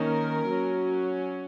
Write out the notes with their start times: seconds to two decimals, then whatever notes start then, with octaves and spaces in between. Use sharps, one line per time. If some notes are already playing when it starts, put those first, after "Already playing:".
Already playing: D#3 A#3 C#4 A#4
0.48 F#3 C#4